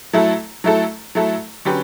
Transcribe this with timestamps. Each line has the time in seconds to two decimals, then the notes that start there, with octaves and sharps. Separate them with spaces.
0.13 F#3 A3 E4 A4
0.64 F#3 A3 E4 A4
1.15 F#3 A3 E4 A4
1.65 D3 F#3 C#4 G4 B4